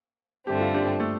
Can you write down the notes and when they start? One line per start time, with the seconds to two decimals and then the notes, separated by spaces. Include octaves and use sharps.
0.47 G2 D3 A3 C4 G4
0.61 F4
0.74 D4 G4
1.00 A3